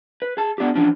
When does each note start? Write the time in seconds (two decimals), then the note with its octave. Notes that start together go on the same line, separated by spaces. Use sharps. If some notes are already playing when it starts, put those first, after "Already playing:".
0.22 B4
0.37 G#4 A5
0.58 B3 D4 F4 G4
0.75 E3 F3 C#4 D4